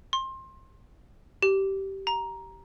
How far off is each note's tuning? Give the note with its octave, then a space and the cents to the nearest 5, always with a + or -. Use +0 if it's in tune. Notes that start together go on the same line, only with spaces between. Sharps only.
C6 +25
G4 -15
A#5 +10